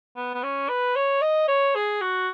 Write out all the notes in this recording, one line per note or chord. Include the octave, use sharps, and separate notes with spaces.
B3
B3
C#4
B4
C#5
D#5
C#5
G#4
F#4